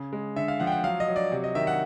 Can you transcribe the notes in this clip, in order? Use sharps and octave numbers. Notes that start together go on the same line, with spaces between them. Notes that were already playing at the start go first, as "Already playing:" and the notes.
Already playing: C#3
G#3
D3 E5
F5
F3 F#5
G5
F#5
F#3 F5
D#5
F#3
D5
C3
D#5
D#3 E5
F#5